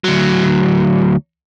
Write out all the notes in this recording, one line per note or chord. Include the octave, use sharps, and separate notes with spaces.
D2 F#3